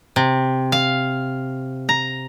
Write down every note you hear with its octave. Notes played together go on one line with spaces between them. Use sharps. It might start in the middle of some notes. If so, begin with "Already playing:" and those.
C3
F5
A#5